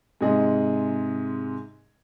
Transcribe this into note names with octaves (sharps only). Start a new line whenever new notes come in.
G#2 C3 G#3 G#4 D#5